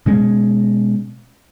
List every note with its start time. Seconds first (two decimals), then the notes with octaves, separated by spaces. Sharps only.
0.06 B2 G#3 C#4